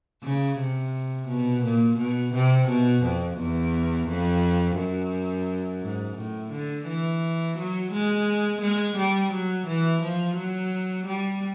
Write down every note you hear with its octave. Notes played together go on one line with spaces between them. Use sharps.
C#3
C3
B2
A#2
B2
C3
B2
F2
E2
F2
F#2
G#2
A2
D3
E3
F#3
G#3
G#3
G3
F#3
E3
F3
F#3
G3